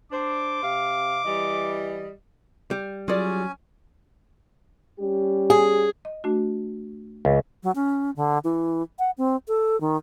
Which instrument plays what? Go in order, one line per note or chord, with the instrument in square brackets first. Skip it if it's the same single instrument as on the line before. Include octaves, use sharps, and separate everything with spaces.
[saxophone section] D4 C5 [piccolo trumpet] D6
[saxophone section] C3 F5
E3 G3 D#5
[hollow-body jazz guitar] G3
[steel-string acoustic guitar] F#3 [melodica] C#4 G#5 [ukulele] F4 G#4 D5
[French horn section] G3 C#4 G4
[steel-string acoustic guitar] G#4
[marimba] D#5
A3 D4 F#4
[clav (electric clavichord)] C#2
[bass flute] F#3
C#4
D3
E3
F#5
C4
A4
D#3